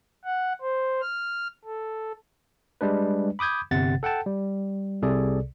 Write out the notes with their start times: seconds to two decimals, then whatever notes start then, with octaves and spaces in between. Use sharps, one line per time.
0.24 F#5
0.61 C5
1.02 F6
1.65 A4
2.81 G3 G#3 D4 B4
3.39 B5 D6 D#6 G6 G#6
3.71 G1 C3 F#5 A6
4.03 A4 F#5 G5 A5
4.26 G3
5.02 C2 C3 G#4 A4 D5